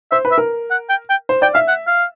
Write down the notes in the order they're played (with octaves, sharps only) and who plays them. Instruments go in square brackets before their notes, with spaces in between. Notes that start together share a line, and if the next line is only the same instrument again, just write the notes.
[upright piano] C5 [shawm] E5
[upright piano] B4
[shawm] E5
[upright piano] A#4
[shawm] F#5
G5
G5
[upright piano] C5
[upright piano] D5 [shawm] G5
[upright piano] E5 [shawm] F5
[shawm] F#5
F5